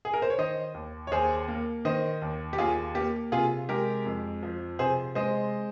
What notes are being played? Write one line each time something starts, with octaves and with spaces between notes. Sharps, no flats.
G#4
A#4
C5
C#5
D#3 C5 D#5
D#2
C#5
D#2 G#4 C5
A#3
D#3 C5 D#5
D#2
G4
D#2 F4 G#4
A#3 G4
C3 F4 G#4
G#3 G4 A#4
F2
F3
C3 G#4 C5
G#3 C5 D#5